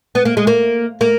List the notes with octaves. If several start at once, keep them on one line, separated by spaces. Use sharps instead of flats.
B3
A#3
G#3
A#3
A#3